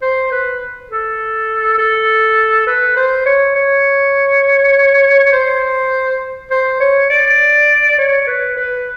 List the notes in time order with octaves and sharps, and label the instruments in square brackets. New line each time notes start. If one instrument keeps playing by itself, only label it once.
[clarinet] C5
B4
A4
A4
B4
C5
C#5
C#5
C5
C5
C#5
D5
C#5
B4
B4